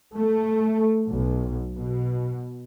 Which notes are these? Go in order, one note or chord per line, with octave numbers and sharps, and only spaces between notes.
A3
B1
B2